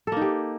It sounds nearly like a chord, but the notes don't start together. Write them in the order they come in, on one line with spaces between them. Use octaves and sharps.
A4 A#3 D#4 G4